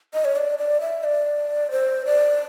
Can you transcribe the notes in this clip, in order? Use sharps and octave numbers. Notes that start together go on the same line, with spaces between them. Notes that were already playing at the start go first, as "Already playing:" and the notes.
D#5
C#5
D5
D5
E5
D5
C5
D5